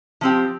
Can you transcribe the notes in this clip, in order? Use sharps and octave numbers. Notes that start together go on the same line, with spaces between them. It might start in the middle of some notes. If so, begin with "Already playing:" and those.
F3 C4 G4